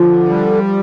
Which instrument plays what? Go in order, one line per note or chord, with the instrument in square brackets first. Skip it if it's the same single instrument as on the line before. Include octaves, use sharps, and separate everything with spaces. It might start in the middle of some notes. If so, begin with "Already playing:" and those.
Already playing: [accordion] D3 [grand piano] F3
[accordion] G3